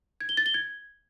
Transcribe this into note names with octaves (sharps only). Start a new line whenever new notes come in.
G#6
G7
A6
G7
G#6